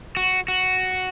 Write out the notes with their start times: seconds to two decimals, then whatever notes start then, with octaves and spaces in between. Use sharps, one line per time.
0.17 F#4
0.48 F#4